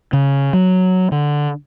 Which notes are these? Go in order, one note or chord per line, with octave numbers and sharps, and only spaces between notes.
C#3
F#3
D3